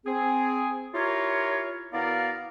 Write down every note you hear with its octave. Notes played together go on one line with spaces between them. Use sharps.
C4 G#4
E4 F4 G4 A#4 C#5
B2 B3 E4 A#4 D5 F5